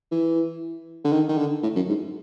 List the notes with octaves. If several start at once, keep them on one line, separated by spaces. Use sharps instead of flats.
E3
D3
D#3
D#3
D3
A2
F#2
G#2